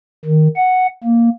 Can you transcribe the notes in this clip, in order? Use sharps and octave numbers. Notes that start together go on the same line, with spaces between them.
D#3
F#5
A#3